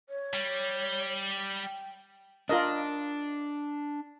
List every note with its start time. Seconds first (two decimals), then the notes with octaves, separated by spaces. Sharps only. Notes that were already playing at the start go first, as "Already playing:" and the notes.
0.09 C#5
0.34 G3
1.60 G5
2.49 D4 F4 A#4 D#5